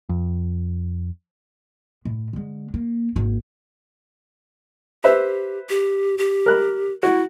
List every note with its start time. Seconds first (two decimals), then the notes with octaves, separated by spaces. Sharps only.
0.09 F2
2.05 A2
2.33 D3 G#3
2.74 A#3
3.16 G#1 A#3
5.04 G4 B4 C5 E5
5.69 G4
6.18 G4
6.46 A#4 F#6
7.03 E4 F#4